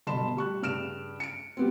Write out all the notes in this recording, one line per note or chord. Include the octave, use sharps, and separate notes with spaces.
G1 B2 A5 B5 C6 E7
G3 C#6 F#6
G2 C#3 F6 D7 E7
C#7 D7
G3 B3 C4